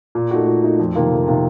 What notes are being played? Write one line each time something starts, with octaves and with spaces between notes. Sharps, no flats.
A#2
A3 D#4 F#4
A#2
A3 D#4 F#4
F2
C3 D#3 A#3 F4
F2
C3 D#3 A#3 F4